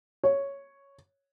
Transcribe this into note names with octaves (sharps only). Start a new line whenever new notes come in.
C#5